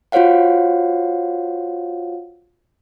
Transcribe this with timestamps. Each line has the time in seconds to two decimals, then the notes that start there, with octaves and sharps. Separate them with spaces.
0.12 F4 F#4 C5 C#5 F5 F#5